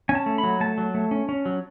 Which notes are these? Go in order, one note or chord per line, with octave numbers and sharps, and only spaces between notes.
C#4 G#5
A5
A3
B5
F#3
A3 A5
F#3
A3
C#4
C#4
F#3